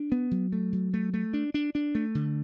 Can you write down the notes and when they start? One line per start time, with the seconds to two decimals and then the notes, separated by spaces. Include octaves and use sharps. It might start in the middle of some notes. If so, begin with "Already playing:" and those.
Already playing: D4
0.12 B3
0.31 F#3
0.52 A3
0.73 F#3
0.94 A3
1.14 A3
1.33 D4
1.54 D4
1.75 D4
1.95 A3
2.15 D3